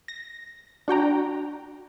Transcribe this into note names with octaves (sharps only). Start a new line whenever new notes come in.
A#6
D4 F#4 G5 A#5